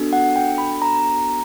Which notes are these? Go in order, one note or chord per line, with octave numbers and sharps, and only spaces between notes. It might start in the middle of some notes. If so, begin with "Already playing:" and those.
Already playing: B3 D4 F#4 A4
F#5
G5
B5
A#5